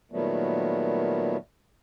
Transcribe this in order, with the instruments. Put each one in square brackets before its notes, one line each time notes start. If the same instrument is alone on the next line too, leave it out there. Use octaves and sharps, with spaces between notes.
[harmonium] A#2 D#3 F#3 G3 A3 B3